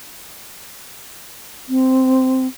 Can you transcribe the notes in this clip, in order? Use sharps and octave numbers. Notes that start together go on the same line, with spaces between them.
C4